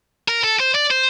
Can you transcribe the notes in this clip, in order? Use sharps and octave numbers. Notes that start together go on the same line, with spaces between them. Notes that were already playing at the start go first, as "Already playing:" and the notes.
A#4
A4
C5
D5
C5